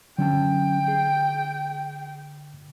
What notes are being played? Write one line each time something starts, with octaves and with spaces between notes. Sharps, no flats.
D3 F#3 C#4 G5 A5
G#4